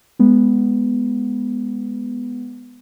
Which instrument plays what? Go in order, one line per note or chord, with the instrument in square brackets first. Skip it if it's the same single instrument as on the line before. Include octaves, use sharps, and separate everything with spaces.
[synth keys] G#3 B3